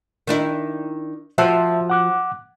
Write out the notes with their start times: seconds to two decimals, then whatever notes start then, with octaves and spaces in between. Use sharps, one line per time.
0.27 D#3 D4 E4
1.38 F3 F#4 C5 E5 A5 E6
1.90 F#5 D6 F#6